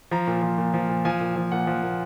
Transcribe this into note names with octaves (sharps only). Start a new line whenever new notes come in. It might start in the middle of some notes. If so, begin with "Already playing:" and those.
F3 A#5
A#2
F3
A#2
F3
A#2
F3 G#5
A#2
F3
A#2 F#5
F3 F#5
A#2